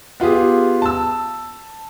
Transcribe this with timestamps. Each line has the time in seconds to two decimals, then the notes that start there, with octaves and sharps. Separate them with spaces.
0.20 B3 F4 G4 G#4
0.82 A5 E6